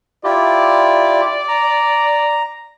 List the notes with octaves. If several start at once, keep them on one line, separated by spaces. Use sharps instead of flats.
E4 F4 G4 D5
A#5